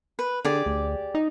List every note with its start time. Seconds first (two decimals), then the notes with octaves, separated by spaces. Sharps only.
0.19 B4
0.45 D3 G4 G#4 D5
0.66 D2
1.15 D#4